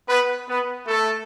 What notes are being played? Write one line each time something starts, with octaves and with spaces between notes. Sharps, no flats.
B3 B4
B3 B4
A3 A4